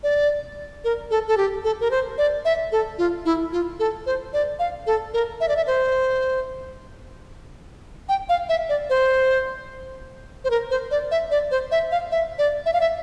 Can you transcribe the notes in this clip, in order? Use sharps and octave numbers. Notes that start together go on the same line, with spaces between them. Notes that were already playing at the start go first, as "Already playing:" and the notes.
D5
A#4
A4
A4
G4
A4
A#4
C5
D5
E5
A4
F4
E4
F4
A4
C5
D5
F5
A4
A#4
E5
D5
E5
C5
G5
F5
E5
D5
C5
C5
A#4
C5
D5
E5
D5
C5
E5
F5
E5
D5
E5
F5
E5